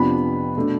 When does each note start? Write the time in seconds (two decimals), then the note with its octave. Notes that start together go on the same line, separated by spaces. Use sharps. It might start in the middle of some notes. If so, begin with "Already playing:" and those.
Already playing: F2 C3 F3 B3 D4 B5
0.57 B2 A3 D4